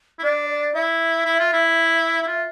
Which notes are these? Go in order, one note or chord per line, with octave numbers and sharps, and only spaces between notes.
E4
D4 D5
D5
E4 E5
E4
F4
E4
E4
F4